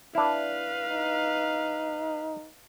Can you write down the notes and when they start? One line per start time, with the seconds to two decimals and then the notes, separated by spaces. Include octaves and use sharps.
0.15 D4 E4 B4 F5
0.87 D#4